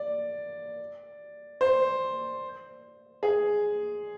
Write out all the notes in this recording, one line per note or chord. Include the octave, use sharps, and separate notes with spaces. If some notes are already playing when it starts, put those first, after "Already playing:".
Already playing: D5
C5
G#4